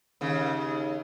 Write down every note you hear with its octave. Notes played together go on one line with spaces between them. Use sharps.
D#2 C#3